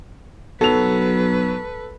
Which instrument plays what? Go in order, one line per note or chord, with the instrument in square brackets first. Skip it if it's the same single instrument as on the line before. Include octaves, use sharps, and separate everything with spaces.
[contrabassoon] B1 [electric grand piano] F#3 [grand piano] A4 F7 [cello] B4